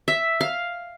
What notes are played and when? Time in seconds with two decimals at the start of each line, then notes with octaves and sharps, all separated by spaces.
0.08 E5
0.41 F5